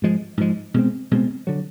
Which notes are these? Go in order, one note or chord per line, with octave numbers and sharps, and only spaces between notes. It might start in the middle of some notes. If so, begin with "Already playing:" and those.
G#2 F3 G#3
G#2 F3 G#3
B2 G#3 C4
B2 G#3 C4
D3 F#3